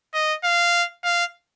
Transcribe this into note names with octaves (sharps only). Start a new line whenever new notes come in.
D#5
F5
F5